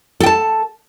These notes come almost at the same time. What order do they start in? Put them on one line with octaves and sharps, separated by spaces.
A4 G5 A5